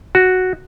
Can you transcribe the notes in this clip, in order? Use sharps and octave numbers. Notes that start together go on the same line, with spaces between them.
F#4